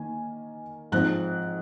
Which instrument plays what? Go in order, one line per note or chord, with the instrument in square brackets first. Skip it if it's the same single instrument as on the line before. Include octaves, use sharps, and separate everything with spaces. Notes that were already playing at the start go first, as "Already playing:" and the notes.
Already playing: [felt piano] D#3 A#3 G#5
G#2 F3 C4 F#6